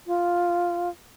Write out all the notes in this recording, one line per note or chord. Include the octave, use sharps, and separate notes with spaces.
F4